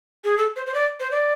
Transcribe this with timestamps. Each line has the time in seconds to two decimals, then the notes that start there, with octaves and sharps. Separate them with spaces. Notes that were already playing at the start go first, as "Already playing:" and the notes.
0.24 G#4
0.37 A4
0.56 C5
0.66 C5
0.74 D5
0.99 C5
1.11 D5